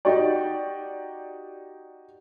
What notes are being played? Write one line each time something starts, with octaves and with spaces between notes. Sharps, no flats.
D#4 F#4 G4 D5